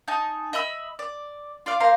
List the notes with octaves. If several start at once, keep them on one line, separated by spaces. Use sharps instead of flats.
D#4 G#5 A5
D#5 E5 B5 E6
D5
F4 D5 F5
A#3 C5 F5 A#5